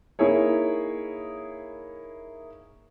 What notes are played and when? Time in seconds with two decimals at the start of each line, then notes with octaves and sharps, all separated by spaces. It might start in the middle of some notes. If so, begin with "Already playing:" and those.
0.19 A#3 D#4 E4 G#4 C#5